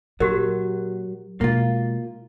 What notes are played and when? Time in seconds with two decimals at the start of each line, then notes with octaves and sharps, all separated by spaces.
0.20 A#2 F#3 F#4 G4 A#4
1.41 B2 G#3 A#3 F4